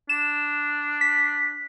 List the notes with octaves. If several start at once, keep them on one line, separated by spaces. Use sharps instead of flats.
D4 E7
B6